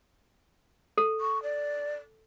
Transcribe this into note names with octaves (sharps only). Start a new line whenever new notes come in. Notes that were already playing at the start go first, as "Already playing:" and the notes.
A4
C#6
D5